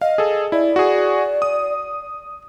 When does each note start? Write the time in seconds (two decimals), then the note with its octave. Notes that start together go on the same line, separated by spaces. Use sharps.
0.01 D#5 F5
0.18 G#4 A4
0.52 E4 D5
0.76 F#4 G#4
1.42 D#6